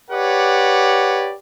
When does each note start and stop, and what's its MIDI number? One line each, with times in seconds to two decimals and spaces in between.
0.10 1.34 67
0.10 1.34 71
0.10 1.34 73
0.10 1.34 74
0.10 1.34 78